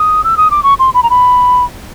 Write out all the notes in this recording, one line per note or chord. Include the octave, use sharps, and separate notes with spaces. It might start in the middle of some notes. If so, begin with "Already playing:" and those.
Already playing: D#6
E6
D#6
D6
C#6
C6
B5
A#5
B5